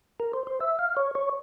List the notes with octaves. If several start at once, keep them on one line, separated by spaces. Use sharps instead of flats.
A#4
C5
C5
E5
F5
C#5
C#5